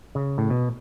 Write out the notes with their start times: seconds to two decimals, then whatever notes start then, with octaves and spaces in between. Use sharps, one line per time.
0.15 C#3
0.38 A2
0.50 B2